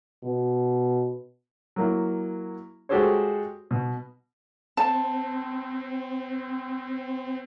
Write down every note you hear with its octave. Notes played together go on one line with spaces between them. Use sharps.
B2
F#3 A#3 E4
G#3 F#4 G4 A4 C5 C#5
B2
C4 A5